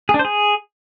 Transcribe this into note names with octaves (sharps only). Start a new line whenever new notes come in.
G#4
D4
C5
G#4